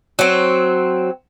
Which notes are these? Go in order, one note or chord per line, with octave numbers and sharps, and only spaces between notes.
F#3 C4